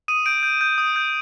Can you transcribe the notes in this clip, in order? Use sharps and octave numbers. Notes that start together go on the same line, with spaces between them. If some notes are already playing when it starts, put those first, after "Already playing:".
D#6 D#7
G6 D7
G6
G6
D#6
G6